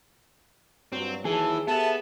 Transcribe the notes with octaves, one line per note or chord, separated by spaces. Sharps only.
G2 A#2 F#3 C4
D#2 E3 F#3 G#4 A5
B3 G4 A4 E5 A5